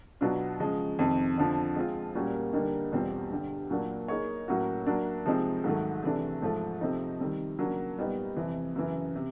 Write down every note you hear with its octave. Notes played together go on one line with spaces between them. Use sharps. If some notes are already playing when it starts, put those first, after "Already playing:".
B2 F#3 B3 D4 F4
C#3 F3 G#3
F2 C3 D#3
F2 D3 F3
G#3 C4 F4
A#2 G3 A#3 C#4 F#4
D3 G3 A#3 D#4
E2 B2 G3 C4 F4
G2 D3 G3
A#2 F#3 A#3 D4
A#3 D#4 G#4 C#5
A2 F#3 A#3 C#4 F#4
F#3 A#3 D4
C3 F3 G#3 C4 D#4
G#2 D#3 F#3 A3
C3 E3 A3 D4
G#2 F3 A3
C3 F3 A3 C4 D#4
D#3 G3 C4
C#3 F#3 A#3 D4
A#2 G3 B3 D#4
F2 C3 E3
F#2 C#3 E3
C3